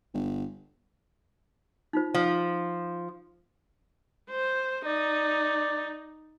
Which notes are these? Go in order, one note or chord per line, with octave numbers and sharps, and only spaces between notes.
G1
D#4 F4 C5
F3
C5
D#4 D5